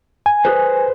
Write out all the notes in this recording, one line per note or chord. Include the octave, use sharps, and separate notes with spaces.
G#5
G#4 B4 C5